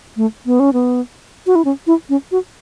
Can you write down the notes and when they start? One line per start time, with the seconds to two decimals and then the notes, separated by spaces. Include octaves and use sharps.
0.17 A3
0.46 B3
0.60 C#4
0.73 B3
1.46 F#4
1.55 E4
1.65 C#4
1.87 E4
2.09 C#4
2.32 F#4